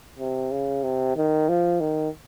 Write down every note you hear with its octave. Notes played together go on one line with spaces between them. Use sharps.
C3
C#3
C3
D#3
F3
D#3